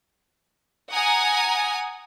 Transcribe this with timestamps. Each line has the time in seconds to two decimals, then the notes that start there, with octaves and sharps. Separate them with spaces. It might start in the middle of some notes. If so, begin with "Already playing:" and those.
0.93 F#5 G#5 A#5 D#6